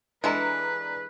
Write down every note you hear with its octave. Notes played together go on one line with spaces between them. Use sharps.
E3 G#3 D4 A4 B4 A#5